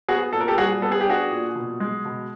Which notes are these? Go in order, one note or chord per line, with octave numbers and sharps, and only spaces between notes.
B3 F#4 G#4
A#2 A4
A#4
G4 A4
G3 F#4 G#4
B3 A4
G#4
G4
D4 F#4 G#4
A#2
B2
G#3
B2